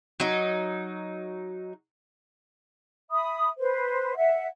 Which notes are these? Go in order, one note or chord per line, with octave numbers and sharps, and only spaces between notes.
F#3 D#4
E5 B5 D#6
B4 C5
E5 F#5